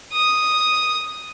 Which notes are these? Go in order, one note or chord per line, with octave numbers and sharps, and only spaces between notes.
D#6